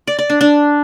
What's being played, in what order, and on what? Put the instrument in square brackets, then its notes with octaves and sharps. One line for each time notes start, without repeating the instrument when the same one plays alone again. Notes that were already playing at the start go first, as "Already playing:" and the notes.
[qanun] D5
D5
D4
D4